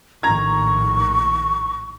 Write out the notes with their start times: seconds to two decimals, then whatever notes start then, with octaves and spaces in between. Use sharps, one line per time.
0.23 A#1 A2 D#3 A#5 C#6 G#6